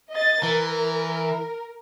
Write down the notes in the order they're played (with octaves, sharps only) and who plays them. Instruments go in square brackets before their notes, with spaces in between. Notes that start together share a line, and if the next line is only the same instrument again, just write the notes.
[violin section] D#5 A6
[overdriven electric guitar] E3 [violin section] A#4